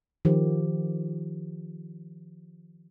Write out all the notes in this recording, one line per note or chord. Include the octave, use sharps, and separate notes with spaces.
D#3 F3 G4